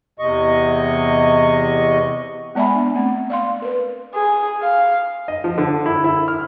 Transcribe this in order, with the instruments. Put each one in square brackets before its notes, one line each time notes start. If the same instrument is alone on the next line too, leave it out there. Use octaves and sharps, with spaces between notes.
[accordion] E2 C3 D#5 C#6
[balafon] G#3 B3 D5 E5 G#5 B5
D4
A3 C4
D5 F5 C6
A#4 B4
[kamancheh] G#4
F5
[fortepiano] D#5
F3
D3
E4
E4
F6